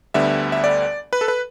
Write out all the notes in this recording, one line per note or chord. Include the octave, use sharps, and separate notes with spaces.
D2 D3 G3 B3 E5
E5
D5
B4
A4
B4